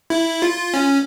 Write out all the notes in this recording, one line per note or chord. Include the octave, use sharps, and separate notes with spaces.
E4
F4
C#4